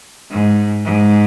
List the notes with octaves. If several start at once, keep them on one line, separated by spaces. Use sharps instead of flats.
G#2
G#2